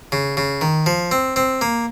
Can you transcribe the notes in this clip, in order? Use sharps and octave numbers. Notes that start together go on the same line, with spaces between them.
C#3
C#3
D#3
F3
C4
C4
A#3